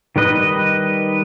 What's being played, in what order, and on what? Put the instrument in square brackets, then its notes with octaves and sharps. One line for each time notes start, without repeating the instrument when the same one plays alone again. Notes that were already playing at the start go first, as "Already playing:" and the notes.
[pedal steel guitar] D#3 G3 B4 D#5